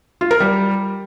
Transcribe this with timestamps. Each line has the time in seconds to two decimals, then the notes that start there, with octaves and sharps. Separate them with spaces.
0.21 F4
0.31 A#4
0.40 G3